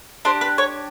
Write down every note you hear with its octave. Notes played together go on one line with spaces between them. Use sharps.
D4 G4 C5
B4
C#5